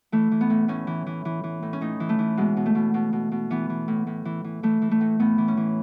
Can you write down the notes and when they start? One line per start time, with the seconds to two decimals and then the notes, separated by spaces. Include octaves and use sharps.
0.12 E3 A3
0.31 E3
0.41 B3
0.50 A2
0.68 A2 C#4
0.87 E3
1.06 E3
1.25 E3
1.44 E3
1.63 A2
1.73 C#4
1.81 A2 D#4
2.00 E3
2.09 A3
2.19 E3
2.37 B2 G#3
2.57 B2
2.66 A3
2.75 B2
2.94 B2
3.13 B2
3.32 B2
3.50 E3 B3
3.70 E3
3.88 A2
4.07 A2
4.25 E3
4.44 E3
4.63 E3 A3
4.82 E3
4.91 A3
5.01 A2
5.19 A2 B3
5.38 E3
5.48 C#4
5.57 E3